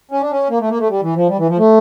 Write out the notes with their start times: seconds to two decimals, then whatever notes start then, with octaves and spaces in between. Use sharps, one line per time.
0.11 C#4
0.21 D4
0.31 C#4
0.50 A#3
0.60 A3
0.70 A#3
0.79 A3
0.89 G3
1.03 E3
1.16 F3
1.28 G3
1.39 E3
1.49 F3
1.58 A3